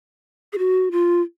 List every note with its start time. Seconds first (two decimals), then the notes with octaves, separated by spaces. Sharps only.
0.53 G#4
0.58 F#4
0.92 F4